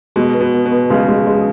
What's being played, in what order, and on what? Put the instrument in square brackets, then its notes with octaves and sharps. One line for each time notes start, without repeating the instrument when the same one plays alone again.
[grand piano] B2 [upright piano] G#3
[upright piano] B3
[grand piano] B2
[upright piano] B3
[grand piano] B2
[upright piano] B3
[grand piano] C#3 [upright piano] G#3
[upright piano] G#3
G#3